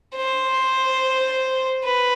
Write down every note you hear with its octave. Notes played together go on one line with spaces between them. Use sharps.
C5
B4